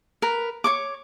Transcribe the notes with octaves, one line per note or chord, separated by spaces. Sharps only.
A#4 B4
C#5 C#6 D6